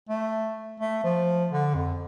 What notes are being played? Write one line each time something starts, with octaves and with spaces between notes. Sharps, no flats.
A3
A3
F3
D3
F2